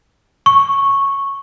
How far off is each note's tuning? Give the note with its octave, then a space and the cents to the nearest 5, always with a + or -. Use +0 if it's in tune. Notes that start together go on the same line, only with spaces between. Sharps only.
C#6 -5